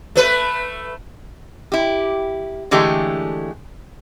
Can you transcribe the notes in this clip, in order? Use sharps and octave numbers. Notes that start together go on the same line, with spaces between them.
A3 B4
E4 G4
D3 E3 G#3 A3 G4